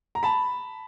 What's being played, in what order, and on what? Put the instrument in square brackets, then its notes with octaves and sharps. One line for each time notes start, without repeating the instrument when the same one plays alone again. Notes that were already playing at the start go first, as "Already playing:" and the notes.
[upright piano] A#5
A5 B5